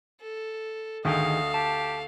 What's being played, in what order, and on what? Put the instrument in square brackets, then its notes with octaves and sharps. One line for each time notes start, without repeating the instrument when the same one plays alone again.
[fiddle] A4
[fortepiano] D2 [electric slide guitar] D#3 G#4 G5 [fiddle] A4 F5 [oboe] D#5
[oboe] G4 [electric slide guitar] A5